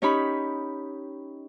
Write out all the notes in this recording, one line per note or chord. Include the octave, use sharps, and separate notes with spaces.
C#4 D#4 G4 C#5 B5